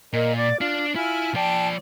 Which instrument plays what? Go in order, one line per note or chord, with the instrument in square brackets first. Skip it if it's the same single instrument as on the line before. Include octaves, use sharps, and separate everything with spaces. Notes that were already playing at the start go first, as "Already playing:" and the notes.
[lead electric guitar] A#2 [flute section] A#4 D#5
[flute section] D5 D6
[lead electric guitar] D4 [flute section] F4
[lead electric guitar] E4 [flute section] F4 G#5 F6
[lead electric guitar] F3 D5 [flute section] G5 A5